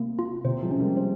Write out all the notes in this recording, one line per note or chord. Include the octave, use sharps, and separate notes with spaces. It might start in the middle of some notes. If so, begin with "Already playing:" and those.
Already playing: C3 A#3
F4
C3 C5
F3 G#3
C#4
G3 A#3
C5